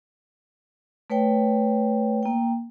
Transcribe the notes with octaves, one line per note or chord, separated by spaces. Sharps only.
A3 B4 C#5 G5
A#3 G5